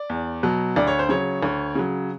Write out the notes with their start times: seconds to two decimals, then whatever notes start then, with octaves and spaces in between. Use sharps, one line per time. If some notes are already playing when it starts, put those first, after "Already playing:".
Already playing: D5
0.10 E2
0.43 B2 F#3
0.76 D2 D5
0.87 C#5
0.99 C5
1.09 C#3 F#3 C#5
1.43 D2
1.75 C#3 F#3